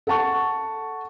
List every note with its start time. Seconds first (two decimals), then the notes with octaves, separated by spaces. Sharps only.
0.07 A4 F#5 A5 C#6